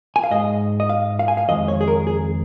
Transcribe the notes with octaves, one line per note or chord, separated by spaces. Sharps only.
G#5
F5
G#2 G#3 D#5
D#5
F5
F5
G#5
F5
F2 D#3 G#3 D#5
C#5
G#4
A#4
G#4